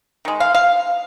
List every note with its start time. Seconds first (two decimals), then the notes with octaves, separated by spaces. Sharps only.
0.25 D#3 G#3
0.40 F5
0.55 F5